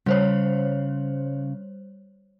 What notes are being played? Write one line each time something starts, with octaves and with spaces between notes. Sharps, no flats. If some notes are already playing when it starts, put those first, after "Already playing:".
C#3 G3 C5 C#5